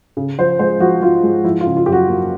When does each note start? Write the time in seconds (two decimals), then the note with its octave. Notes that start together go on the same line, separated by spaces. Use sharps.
0.17 C#3
0.38 F3 C5
0.59 G#3 C5
0.80 F3 F#4
1.02 F3 F4
1.23 G#3
1.44 F3 E4
1.61 F4
1.66 C#3
1.77 F4
1.86 F#2 G4
1.92 F#4
2.08 A#3